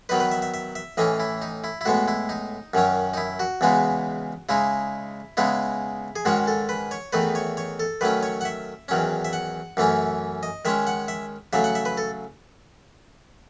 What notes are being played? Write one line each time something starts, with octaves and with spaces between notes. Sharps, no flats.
D#3 F#3 B3 D#4 B4
B4
E5
E5
E5
E5
A2 E3 A3 C#4 D#5
E4
D#4
E4
E4
A2 G#3 B3 F#4
E4
D#4
F#2 D#3 F#3 C#4
D#4
E4
F#4
E2 C#3 G#3 B3 D#4
C#3 G#3 D#4 E4
C#3 G#3 B3 D#4 E4
G#4
G#2 D#3 G#3 C#4 F#4
A4
B4
C#5
E2 D#3 A3 D#4 B4
C#5
C#5
A4
D#3 F#3 A3 C#4 B4
C#5
F#5
E5
E2 D#3 F#3 C#4
E5
F#5
F#2 E3 A3 C#4
D#5
D#3 G#3 C#4 E5
F#5
E5
C#3 F#3 A3 E5
F#5
E5
B4
A4